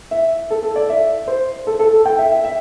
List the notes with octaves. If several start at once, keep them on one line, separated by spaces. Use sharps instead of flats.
E5
A4
A4
D5
E5
C5
A4
A4
A4
G5
E5
E5
E5